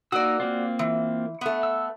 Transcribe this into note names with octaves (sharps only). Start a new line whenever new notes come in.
A#3 D#4 F#4 D5 E6
A#3 C4 F4
E3
A3 B3
E6